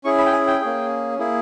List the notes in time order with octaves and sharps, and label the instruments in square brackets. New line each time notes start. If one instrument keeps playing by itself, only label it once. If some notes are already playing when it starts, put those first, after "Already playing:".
[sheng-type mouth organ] C#4 E4 G#4 C#6
B5
G5
G#5
G5
A#3 C#4 G#4
A#3 E4 G#4